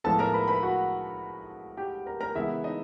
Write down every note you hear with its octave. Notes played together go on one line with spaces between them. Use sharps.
A2 F3 G#3 B3 A4 A5
A#4 A#5
B4 B5
B4 B5
F#4 F#5
G4 G5
A#4 A#5
A#4 A#5
C#3 E3 G#3 B3 E4 E5
D#4 D#5